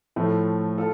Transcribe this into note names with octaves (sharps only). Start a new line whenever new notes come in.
A2 F3 A3
F4 A4